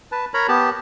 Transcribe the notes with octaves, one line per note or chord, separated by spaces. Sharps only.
B4 A5
A#4 C#5 A#5 B5
B3 G4 A5